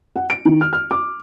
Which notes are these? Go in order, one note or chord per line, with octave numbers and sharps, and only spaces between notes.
F#5
D7
D#3
F6
F6
D6